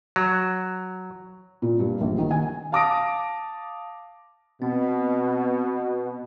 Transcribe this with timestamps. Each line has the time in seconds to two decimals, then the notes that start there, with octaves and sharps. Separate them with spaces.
0.16 F#3
1.62 A#2
1.79 G2
2.01 A#1
2.18 D#3
2.31 G#5
2.72 F5 A5 D6 D#6 A#6 D7
4.62 B2 C4